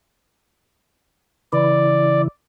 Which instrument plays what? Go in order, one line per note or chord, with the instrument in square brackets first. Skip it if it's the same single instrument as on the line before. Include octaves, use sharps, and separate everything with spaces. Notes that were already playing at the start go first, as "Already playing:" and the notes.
[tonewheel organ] C#3 E3 E4 [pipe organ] D5